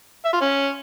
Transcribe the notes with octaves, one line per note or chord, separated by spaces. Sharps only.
E5
F4
C#4